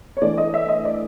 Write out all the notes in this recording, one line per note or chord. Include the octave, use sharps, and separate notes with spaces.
C#5
E3 A3 D4 D5
D#5
E5
D#5
D5